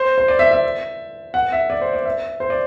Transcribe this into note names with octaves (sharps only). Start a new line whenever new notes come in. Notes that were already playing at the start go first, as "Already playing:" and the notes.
Already playing: C5
C5
D5
E5
E5
F#5
E5
D5
C5
D5
E5
C5
D5